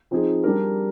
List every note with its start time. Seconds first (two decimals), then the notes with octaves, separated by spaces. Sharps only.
0.11 F3 C4 D#4 G#4
0.44 G3 D4 G4 A#4